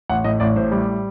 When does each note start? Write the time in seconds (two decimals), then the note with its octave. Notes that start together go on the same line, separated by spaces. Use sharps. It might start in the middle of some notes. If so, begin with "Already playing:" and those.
0.09 A1 F#5
0.25 A2 D#5
0.40 A1 D5
0.56 A2 C5
0.71 G3